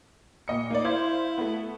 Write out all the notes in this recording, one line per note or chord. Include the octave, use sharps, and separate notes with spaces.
A#2 D#5 C#7
A#3 D#4 D5
E4 C5 F5 G#6
A3 B3